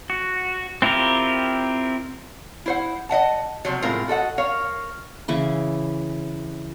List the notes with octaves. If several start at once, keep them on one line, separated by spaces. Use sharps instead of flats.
F#4
C4 E4 F4 G4 A#4
E4 C5 F#5
D#5 E5 F#5 A5
C3 F3 F#3
A2 G#3 C4 F4 A#4
F#4 A4 D#5 F#5
A#4 C#5 F5
C#3 E3 E4